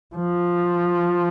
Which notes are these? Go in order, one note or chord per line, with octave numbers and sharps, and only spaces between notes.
F3